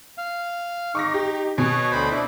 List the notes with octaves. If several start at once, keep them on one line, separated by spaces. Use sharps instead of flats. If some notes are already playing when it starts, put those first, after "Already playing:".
F5
D#4 C#6 D6 A#6
G4
B2 C#5 G#5
D2 C5 B5
D4 E4